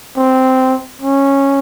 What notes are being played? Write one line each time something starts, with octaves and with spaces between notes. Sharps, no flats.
C4
C#4